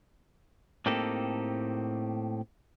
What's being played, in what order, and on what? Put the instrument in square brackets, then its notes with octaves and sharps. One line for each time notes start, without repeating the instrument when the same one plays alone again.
[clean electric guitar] A2 A#3 C4 D#4 G4 A4